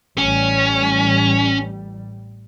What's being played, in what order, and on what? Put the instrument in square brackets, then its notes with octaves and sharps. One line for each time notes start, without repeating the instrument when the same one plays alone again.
[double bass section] A1 G3 [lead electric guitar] C#4